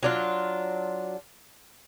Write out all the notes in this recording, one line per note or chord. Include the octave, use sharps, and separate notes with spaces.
F#3 D4 F4